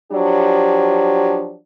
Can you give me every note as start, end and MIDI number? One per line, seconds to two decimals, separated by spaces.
0.12 1.54 53
0.12 1.54 54
0.12 1.54 62
0.12 1.54 67